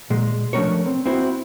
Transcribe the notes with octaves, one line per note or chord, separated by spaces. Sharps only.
A#2 G#3
F3 A3 C#4 D4 A#4 C#5
C4
C4 E4 F#4 C5